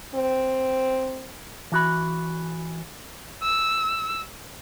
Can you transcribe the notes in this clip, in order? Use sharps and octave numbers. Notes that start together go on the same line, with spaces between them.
C4
E3 F#4 B5
E6